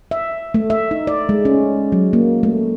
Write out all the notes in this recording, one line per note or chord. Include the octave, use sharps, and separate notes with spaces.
E5
A3
E5
D#4
D5
G#3
C#4
F#3
A#3
A3